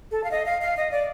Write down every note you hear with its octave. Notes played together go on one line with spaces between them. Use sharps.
A4
F5
D#5
F5
F5
D#5
D5